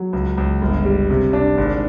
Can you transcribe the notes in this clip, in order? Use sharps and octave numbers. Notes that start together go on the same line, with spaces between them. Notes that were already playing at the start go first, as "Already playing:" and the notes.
Already playing: F#3
C#2
C#2
G1
G3
C3
D4
G#1